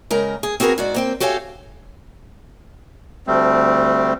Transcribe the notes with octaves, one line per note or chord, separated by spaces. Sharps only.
C#3 G#3 A#4 G5 A#5
G#4
C4 F#4 G#4 A#4 B4
G#2 F#4 D5
A#3 C4 G5
F#4 G4 A4 C#5 F5 G#5
D2 G3 A3 C4